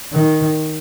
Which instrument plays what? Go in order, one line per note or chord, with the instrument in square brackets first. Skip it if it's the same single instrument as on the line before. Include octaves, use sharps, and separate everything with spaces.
[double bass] D#3